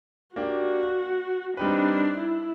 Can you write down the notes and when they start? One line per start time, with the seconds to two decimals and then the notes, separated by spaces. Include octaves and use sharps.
0.36 A#3 D4 F#4 G4
1.57 G3 C4 D4 D#4 G4 B4
2.18 E4